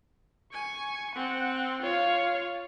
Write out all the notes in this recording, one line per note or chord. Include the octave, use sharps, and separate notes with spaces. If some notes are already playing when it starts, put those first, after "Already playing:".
G#5 C#6
C4 F#5
F4 C#5 F5